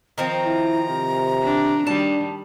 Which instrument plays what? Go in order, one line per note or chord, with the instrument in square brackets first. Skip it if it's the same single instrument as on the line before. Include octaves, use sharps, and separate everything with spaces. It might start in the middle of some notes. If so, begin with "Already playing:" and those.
[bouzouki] D#3 F3 C4 [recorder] A#5
[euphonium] E4
C3
[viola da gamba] D4
[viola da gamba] D#3 G3 [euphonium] D4 [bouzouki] A5